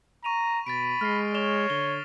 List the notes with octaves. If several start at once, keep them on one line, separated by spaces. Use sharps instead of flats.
A#5 C#6 D#7 F7
B2 B5 A6 B6 D7
G#3 F6 A#6 C7
C#5 E7 F7 G7
D3 G7